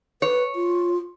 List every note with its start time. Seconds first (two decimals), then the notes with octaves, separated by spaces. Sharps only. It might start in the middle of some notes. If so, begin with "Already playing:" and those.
0.22 B4 C#5
0.55 F4